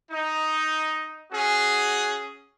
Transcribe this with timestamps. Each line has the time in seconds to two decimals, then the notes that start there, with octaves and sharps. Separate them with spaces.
0.10 D#4
1.32 C#4 F#4 G#4